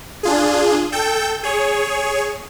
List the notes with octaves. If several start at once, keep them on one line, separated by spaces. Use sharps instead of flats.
D4 F4 G#4
A4 G5 G6
G#4 C#5